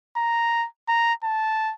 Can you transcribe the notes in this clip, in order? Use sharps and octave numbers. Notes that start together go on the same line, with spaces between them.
A#5
A#5
A5